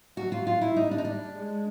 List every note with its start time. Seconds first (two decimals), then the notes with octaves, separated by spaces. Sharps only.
0.17 F#3 F#4
0.32 F4
0.47 F4
0.61 E4
0.76 G3 D#4
0.91 D4
0.98 D#4
1.05 D4
1.35 G#3